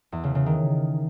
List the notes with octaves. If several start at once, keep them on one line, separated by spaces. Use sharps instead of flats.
E2
C#3
C#3
D#3